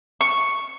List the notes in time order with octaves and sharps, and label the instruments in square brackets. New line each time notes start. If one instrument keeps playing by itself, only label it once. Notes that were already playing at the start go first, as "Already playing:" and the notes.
[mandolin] C#6